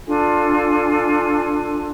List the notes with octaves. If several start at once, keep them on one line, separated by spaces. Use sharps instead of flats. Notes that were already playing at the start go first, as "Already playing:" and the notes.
D4 F4 A4 G#5